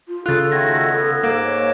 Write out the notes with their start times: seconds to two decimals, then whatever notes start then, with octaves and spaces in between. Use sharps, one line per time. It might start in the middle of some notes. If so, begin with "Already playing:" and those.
0.08 F4
0.26 C#3 F4 A4 F#6 A6
0.52 D#3 A3 F#4 G#6 A#6
0.90 B3
1.23 G#2 A#3 D6 E6
1.44 C#5